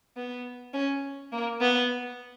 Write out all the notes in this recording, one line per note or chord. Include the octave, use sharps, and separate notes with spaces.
B3
C#4
A#3
B3